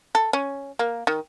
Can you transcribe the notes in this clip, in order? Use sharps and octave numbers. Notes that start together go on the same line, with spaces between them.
A4
C#4
A#3
D#3